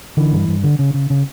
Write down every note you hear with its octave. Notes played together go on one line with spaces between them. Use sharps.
D3 E3
G2
G2
D3
C#3
C#3
C#3